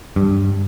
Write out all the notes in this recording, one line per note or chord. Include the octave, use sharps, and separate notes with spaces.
G2